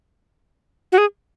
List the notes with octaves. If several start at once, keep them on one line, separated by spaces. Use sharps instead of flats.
F#4
G#4